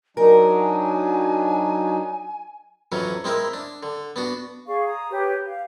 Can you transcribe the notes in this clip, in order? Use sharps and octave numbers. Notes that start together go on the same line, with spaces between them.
F#3 D4 D#4 A#4 G#5
F2 E3 F#3 C#4
G#3 C4 E4 A#4
D4
D3
B3 D4 F#4
G#4 D5 F5 C#6
A#5 D#6
G4 B4 C#5
F5